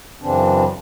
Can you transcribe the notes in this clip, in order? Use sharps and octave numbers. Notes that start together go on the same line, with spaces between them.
F#2 C#3 E3 C4 D4